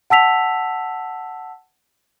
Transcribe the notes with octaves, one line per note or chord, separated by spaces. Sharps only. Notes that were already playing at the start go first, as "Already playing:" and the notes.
F#5 A5 E6 B6 F7